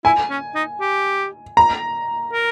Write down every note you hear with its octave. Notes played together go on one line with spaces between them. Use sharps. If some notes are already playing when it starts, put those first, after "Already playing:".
E4 G#5
C#4
D#4
G4
A#5
A#4